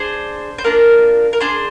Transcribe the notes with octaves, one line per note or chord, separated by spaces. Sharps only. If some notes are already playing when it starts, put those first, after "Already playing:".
Already playing: D4 G#4 C5
C5
A#3 D4 F4 A#4
A#4
D4 G#4 C5